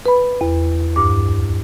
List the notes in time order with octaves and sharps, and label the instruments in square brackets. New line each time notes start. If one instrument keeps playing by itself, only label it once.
[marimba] B4 B5
E2
D2 G2 D6